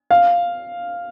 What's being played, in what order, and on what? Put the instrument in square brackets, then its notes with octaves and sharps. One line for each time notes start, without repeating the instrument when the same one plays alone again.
[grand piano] F5